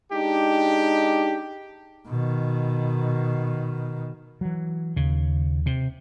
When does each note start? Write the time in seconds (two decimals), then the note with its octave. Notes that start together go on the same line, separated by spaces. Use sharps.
0.12 G#3 D4 D#4 G4
2.08 B2 D#3
4.41 E3 F#3
4.96 D#2 C#3
5.66 C3